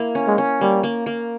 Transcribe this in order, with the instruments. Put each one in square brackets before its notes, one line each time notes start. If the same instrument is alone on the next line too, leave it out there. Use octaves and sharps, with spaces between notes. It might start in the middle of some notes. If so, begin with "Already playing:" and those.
Already playing: [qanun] A#3 E4
C#4
[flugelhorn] G#3
[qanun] C#4
[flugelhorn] G3 [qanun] A#3
[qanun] A#3
A#3